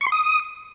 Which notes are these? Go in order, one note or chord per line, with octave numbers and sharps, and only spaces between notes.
C#6
C6
D#6